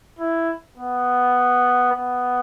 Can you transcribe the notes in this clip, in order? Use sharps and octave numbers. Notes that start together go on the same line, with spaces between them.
E4
B3
B3